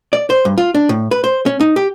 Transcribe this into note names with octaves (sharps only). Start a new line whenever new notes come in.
D5
C5
G2
F4
D4
A2
B4
C5
C#4
D#4
G4